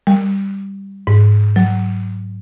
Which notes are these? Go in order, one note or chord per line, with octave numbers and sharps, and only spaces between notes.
G3
G#2
F#3